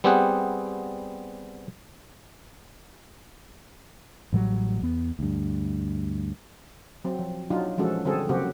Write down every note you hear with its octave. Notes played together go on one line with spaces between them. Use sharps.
G3 B3 C4 G4 G#4 F#5
A1 A2 F#3 G3
E2 B3
D2 G2
F#3 C4
F3
F#3 D4 D#4 F4
E3 F3 G#3 C#4 F#4 A4
D3 G3 C4 F#4 G#4 A4
C#3 F#3 A#3 C4 F#4 G4